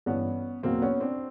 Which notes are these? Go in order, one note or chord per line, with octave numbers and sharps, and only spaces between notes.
G2 E3 B3 C#4
E2 B2 F#3 A#3 C4
B3 C#4
C4 D4